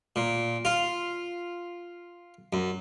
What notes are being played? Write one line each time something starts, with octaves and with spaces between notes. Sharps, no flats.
A#2
F4
F#2